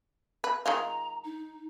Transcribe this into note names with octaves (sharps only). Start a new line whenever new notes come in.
B4
D#3 G#3 F4 A#5
D#4